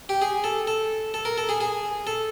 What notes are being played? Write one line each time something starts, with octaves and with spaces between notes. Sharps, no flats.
G4
G#4
A4
A4
A4
A#4
A4
G#4
G#4
A4